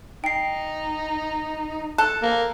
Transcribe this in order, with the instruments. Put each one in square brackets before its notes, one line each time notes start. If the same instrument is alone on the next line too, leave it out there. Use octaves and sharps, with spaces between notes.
[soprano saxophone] D#4 [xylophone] G5 C7
[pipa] A4 [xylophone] F#6
[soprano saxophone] A#3